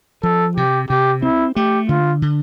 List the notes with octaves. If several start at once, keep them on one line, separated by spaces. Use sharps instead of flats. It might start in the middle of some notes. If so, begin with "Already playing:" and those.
F3 A4
C3 G4
C3 G4
C4 E4
A3 G4
D3 F4
D3